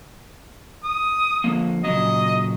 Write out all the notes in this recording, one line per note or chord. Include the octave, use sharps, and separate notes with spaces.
D#6
D3 F3 A#3
A#2 C#3 F#3 D#5